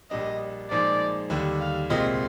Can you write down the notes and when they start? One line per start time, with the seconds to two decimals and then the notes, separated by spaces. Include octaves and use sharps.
0.11 A#1 A#2 G3 D4 D#5
0.71 A#2 F3 G#3 D#4 G#4 D5
1.30 D#2 D3 G3 D4
1.61 F5
1.90 C2 A#2 G#3 C4 F4 D#5